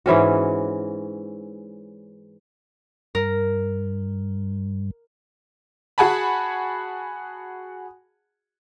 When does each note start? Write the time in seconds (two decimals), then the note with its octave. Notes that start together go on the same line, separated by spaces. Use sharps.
0.06 G#2 E3 C#4 F#4
3.15 G2 A#4
5.98 F#4 G#4 F#5 G#5 A5 B5